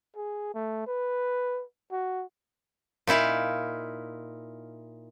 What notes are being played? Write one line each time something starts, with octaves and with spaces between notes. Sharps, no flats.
G#4
A3
B4
F#4
A#2 D#4 E4 F5